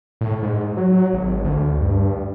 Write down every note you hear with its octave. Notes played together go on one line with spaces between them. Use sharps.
A2
G#2
F#3
G#1
D2
G2